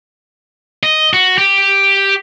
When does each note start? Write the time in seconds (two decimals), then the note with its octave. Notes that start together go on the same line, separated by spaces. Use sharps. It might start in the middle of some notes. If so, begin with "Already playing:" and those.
0.83 D#5
1.13 F#4
1.38 G4